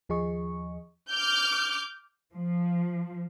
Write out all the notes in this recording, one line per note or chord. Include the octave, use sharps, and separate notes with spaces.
D#2 F3 G#4 D#5 C#6
D6 F6 G6
F3